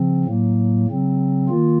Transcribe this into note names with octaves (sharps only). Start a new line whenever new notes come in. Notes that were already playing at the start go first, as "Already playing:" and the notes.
Already playing: C#3 F3 C4
A2 F#3 A#3
C#3 F#3 C4
D#3 A#3 F4